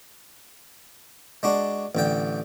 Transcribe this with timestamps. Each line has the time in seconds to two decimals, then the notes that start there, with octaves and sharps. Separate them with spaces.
1.43 G#3 D4 F#4
1.95 A1 D3 G5